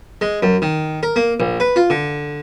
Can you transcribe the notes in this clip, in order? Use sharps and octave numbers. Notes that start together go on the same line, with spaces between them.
G#3
F#2
D#3
A#4
A#3
A#1
B4
F4
D3